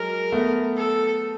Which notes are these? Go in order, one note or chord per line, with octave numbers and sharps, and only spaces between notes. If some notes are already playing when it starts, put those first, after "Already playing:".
Already playing: F#3 G#3 A#4
A3 B3
A4